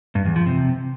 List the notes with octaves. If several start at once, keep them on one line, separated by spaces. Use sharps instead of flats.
G2
E2
F3
C3